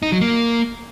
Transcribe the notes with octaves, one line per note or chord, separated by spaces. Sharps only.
D#4
F#3
A#3